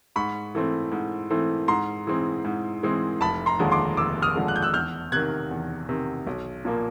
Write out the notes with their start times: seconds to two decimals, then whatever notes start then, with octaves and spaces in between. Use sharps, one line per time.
0.16 G#2 B5 C#6
0.55 E3 A3 C4
0.92 G#2
1.30 E3 A3 C4
1.68 G#2 A#5 C6
2.07 E3 G#3 C4
2.45 G#2
2.83 E3 G#3 C4
3.21 F1 A5 B5
3.46 A#5 C6
3.59 D#2 D3 F3 G#3
3.72 C6 D6
3.97 F1 D6 E6
4.22 D#6 F6
4.35 D#2 D3 F3 G#3
4.48 F#6
4.56 G6
4.62 E6 F#6
4.73 E2 F6 G6
5.12 C3 D#3 F#6 G#6
5.51 E2
5.89 C3 D#3
6.27 B1
6.65 A#2 F3 A#3